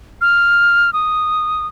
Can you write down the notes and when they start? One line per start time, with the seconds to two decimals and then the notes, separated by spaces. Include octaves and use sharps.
0.21 F6
0.93 D#6